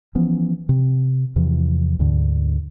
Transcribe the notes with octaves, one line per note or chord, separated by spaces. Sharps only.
E3 F3 B3 C#4
C3
E2 C3 E3 F3
D2 G#2 D3